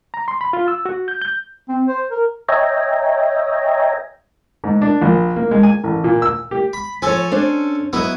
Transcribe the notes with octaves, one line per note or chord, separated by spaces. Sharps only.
A#5
C6
B5
F4
E6
F#4
G6
G6
C4
C5
A#4
C#5 D#5 E5 G5 G#5 A#5
G#2
D4
A#1
A#3
G#3
G#5
A1
A#2
E6
G4
B5
F3 A4 C#5 G#5
C#4 D4 C5
F#3 B3 E4 D#5